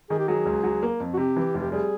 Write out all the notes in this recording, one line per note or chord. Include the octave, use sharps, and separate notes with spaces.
D#3 G#4
G4
F#3 G#4
C#2
F#3
A#3
F2
F#4
C3 G4
E3
F1
G4
G3 G#4